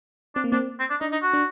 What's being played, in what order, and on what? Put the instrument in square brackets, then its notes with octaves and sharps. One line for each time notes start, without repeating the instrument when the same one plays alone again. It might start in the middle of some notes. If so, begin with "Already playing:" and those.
[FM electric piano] C4 [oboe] D4
[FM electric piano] A#3
[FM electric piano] C4 [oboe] D4
[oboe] C4
D4
[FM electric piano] D4 [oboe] D#4
[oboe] D#4
F#4
[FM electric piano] D4